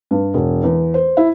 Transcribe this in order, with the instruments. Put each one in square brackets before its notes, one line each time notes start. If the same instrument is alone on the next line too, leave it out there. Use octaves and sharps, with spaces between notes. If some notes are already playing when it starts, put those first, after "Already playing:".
[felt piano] G2
E1
E2
C5
E4